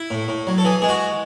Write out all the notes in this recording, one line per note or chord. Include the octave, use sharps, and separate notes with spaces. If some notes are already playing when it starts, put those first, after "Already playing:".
Already playing: E4
A2
A2
F#3
A4
E3 G#4
G#3 G#4
F#4